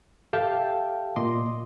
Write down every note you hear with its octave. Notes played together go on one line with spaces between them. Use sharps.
G4 A4 E5 F5 G5 A5
A#2 D#5 C6 D6